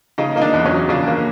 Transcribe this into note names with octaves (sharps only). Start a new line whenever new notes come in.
C#3 D#4
A#3 D#4
D4
E2
C#4
F#3
C#3 D4
A#3